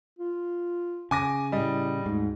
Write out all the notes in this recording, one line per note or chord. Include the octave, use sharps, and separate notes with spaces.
F4
C#3 G#5 D6 A#6
A2 G3 D#5
D2 G#2